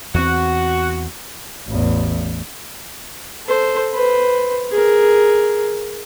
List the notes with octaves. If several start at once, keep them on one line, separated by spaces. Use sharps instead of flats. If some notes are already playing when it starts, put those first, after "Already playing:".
E2 C4 F#4
A1 E2
A4 C5
B4 C5
G#4 A#4